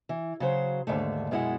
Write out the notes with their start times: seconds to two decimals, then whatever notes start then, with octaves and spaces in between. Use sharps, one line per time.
0.09 E3
0.40 C#3 F#3 C5
0.87 D#2 G#2 D3 A3
1.31 F#2 B2 G#3 E4 F#5